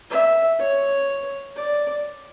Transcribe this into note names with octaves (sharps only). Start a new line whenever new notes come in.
E5
C#5
D5